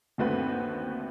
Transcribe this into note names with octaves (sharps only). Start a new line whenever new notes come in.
G1 D#2 A3 C4 F#4 B4